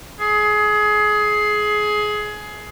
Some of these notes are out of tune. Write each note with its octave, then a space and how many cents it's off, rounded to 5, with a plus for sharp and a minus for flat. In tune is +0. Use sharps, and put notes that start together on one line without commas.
G#4 +20